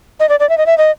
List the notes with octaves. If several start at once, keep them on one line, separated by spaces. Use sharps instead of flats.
D#5
D5
D5
E5
D#5
E5
D#5